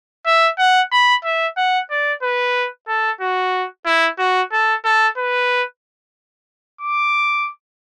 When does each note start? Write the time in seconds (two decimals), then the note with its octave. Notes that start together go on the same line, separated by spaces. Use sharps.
0.26 E5
0.59 F#5
0.92 B5
1.24 E5
1.57 F#5
1.90 D5
2.23 B4
2.88 A4
3.21 F#4
3.86 E4
4.19 F#4
4.52 A4
4.84 A4
5.18 B4
6.81 D6